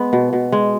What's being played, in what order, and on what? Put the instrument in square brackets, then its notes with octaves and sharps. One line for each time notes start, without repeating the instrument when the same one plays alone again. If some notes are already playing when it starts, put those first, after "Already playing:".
Already playing: [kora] G#3 B3
B2
B2
G#3